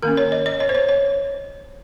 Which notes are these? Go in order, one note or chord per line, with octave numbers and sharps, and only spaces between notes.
D#3 A#3 C#4 A#4
C#5
D#5
D#5
C#5
C5
C#5
C#5